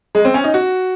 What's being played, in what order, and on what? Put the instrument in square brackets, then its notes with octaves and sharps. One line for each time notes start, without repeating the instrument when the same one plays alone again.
[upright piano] G#3
C4
C#4
D#4
F#4